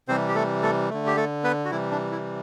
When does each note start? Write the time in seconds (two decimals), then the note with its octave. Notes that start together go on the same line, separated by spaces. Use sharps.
0.08 C3 E3 G3 C4 C5
0.28 G4
0.35 A3 A4
0.63 A3 A4
0.90 D3 A3
1.07 G4
1.17 A3 A4
1.44 B3 B4
1.65 F#4
1.71 C3 E3 G3 E4
1.91 D4
2.11 E4